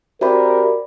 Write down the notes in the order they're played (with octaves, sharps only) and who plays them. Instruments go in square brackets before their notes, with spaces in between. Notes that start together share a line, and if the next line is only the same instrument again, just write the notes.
[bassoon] C3 [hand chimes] F#4 D5 B5 [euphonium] A#4